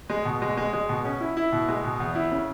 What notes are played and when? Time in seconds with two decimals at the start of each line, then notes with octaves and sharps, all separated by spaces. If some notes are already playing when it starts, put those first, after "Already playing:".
0.10 G#3
0.25 B2
0.42 G#3
0.57 G#3
0.73 G#3
0.89 B2
1.05 C#4
1.20 E4
1.37 E4
1.52 B2
1.68 G#3
1.84 B2
2.00 E2
2.15 E4
2.31 C#3